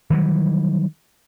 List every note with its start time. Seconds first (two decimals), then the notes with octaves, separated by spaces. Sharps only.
0.10 D#3 E3 F#3 G3